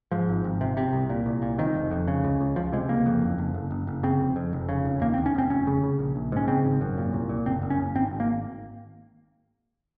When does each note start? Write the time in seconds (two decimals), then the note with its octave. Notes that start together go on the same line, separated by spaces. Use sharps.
0.11 G#2 F3
0.29 G#1
0.44 G#1
0.61 C3
0.77 C3
0.93 C2
1.10 A#2
1.26 C2
1.42 A#2
1.58 C3 D#3
1.75 F1
1.91 F2
2.08 C#3
2.24 C#2
2.41 C#2
2.56 C#2 F3
2.72 C3 G#3
2.89 C#2 A#3
3.06 F2
3.22 F#1
3.38 F#1
3.54 F#1
3.71 F#1
3.87 F#1
4.03 C#3 C4
4.20 F1
4.36 F2
4.53 F1
4.69 C#3
4.85 F1
5.01 D#2 A#3
5.14 C4
5.18 D#2
5.26 C#4
5.34 F1 C4
5.50 F1 C#4
5.67 C#3
5.83 C#3
5.99 A#1
6.16 A#1
6.32 G#2 C#4
6.48 C#3 C4
6.65 G#1
6.81 F#2
6.98 A#2
7.13 C2
7.29 A#2
7.46 F#1 C4
7.62 F#1
7.70 C#4
7.78 F#1
7.95 G#1 C4
8.11 G#1
8.20 A#3